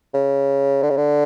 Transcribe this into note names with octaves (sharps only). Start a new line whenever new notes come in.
C#3
D3
C#3
D3